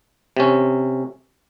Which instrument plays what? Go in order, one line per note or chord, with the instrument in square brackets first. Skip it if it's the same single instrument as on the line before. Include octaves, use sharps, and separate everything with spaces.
[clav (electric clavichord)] C3 C#4